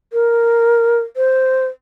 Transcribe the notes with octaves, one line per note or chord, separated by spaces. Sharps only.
A#4
C5